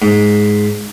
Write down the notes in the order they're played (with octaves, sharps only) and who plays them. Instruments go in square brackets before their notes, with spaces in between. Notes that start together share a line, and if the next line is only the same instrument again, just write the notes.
[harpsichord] G#2